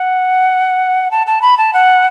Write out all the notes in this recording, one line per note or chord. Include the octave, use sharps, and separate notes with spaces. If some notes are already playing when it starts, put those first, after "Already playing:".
Already playing: F#5
A5
A5
B5
A5
F#5